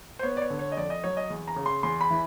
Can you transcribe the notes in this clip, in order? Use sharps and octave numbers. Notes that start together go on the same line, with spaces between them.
C5
B3 C#5
D5
C#5
D3
C#5
D#5
F2 D5
D#5
F#3 C#5
D#5
E2
A#5
C#3
C6
E2 C6
B5
E3